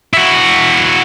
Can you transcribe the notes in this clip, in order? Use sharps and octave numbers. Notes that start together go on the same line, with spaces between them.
E4 F#4